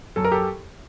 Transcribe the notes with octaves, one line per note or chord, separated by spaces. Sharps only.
F#2 A4
A#4
G4 A4